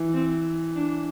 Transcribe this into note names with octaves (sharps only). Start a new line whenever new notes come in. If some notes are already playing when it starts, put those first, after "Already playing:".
Already playing: E3
C4
D4